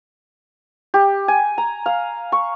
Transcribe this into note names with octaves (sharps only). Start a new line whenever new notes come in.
G4
G#5
A#5
F5
C#6